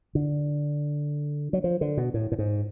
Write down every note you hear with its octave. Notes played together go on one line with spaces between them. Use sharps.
D3
F#3
F3
D3
B2
A2
A2
G#2